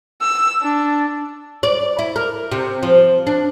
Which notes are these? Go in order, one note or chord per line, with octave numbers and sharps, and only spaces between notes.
E6
D4
D5
E4
A#4
C3
F3
D4